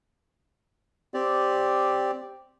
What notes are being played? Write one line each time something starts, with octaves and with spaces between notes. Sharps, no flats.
C4 G4 D5